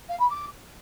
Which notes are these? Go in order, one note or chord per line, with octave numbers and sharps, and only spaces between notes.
F5
B5
D6